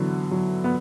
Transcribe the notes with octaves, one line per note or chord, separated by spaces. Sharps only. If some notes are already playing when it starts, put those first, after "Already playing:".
Already playing: D3 E3 F#3 B3
F#3
B3